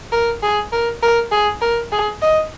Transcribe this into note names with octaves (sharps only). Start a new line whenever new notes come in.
A#4
G#4
A#4
A#4
G#4
A#4
G#4
D#5